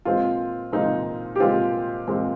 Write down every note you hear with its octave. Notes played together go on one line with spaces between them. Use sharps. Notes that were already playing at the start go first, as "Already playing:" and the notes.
A#2 G#3 C4 F4
A#2 G#3 C4 D#4
G4
A#2 G#3 C4 F4
A#2 G#3 C4